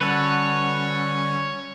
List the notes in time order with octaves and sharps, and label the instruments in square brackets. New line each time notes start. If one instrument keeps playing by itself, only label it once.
[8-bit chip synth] D3 G3 C#4 [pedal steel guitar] F#4 A4 B4 [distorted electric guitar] C#5